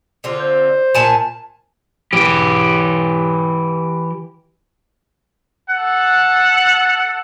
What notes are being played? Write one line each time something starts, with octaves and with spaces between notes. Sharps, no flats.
D3 C4 F4
C5
A#2 G#5 A5
E3 G4
A4 F#5